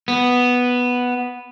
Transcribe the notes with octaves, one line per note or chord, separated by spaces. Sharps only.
B3